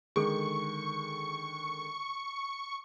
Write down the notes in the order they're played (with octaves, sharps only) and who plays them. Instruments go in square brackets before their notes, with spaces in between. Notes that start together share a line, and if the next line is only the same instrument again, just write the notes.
[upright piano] D3 D#3 G#3 [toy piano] G#4 A4 [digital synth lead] C#6